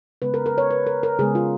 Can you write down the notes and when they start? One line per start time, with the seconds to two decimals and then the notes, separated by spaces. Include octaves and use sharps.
0.22 C#3 G#3 B3 B4
0.34 A#4
0.46 A#4
0.58 C#5
0.71 B4
0.87 A#4
1.03 A#4
1.19 C#3 G#3 B3 G#4
1.35 F4